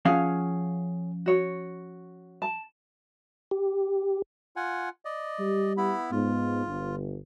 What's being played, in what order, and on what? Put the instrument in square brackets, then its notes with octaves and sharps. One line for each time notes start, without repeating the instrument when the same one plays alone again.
[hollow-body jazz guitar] F3 C#4 F5 [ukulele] G#4 C#5 F#5
[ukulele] F#4 C#5
A5
[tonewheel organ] G4
[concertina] F4 F#5 G#5
D5 D#5
[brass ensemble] G3 G4
[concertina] B3 E4 B5
[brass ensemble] G#2 B3 [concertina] F4
[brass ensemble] G1